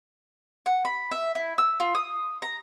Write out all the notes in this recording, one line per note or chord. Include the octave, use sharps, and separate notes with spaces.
F#5
B5
E5
E4
E6
F4
D#6
A#5